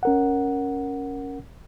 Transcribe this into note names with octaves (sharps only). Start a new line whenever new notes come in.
C#4 A#4 F#5